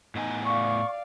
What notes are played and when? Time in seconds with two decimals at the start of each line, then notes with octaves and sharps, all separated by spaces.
0.15 A2 B3 D#4 G#5
0.45 D5 F5 C#6